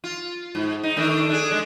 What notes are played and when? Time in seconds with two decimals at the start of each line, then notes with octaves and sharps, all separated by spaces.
0.04 F4
0.55 G#2
0.83 D#4
0.96 D#3 A3 D4
1.29 D4 G#4
1.51 G#3 D4